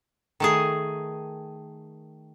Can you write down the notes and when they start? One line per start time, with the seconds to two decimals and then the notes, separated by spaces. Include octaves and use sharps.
0.40 D#3 A3 G#4